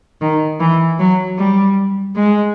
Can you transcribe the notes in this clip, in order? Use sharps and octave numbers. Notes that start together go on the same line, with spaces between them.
D#3
E3
F#3
G3
G#3